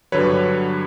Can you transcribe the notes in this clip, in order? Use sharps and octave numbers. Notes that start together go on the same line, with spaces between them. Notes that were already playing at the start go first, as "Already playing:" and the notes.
G2 D3 F#3 B4 C#5